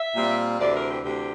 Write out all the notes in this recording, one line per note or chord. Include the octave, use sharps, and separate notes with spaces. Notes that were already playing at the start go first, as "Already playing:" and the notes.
Already playing: E5
A#2 G3 C4 F4
D2 C3 E3 D5
A#4
G4
D2 C3 E3 G4